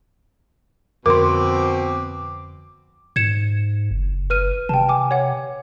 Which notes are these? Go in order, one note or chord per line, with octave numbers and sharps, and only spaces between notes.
F2 B2 D3 C4 A#4 C6 D6
G#2 G#6 C#7 E7
F#1
B4 F6 D#7
C3 G5 A5
G#5 D6
C#5 F#5